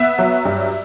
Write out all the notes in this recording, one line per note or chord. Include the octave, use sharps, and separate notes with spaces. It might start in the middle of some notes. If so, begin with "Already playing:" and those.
Already playing: B3 E5
F#3
G2